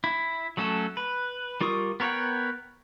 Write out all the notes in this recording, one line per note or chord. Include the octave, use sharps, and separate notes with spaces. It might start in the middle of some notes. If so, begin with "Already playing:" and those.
E4
F#3 A3 C#4 F#4 A4
B4
G3 F4 A#4 C#6 D#6
B3 A#4 C#5 F#5 G5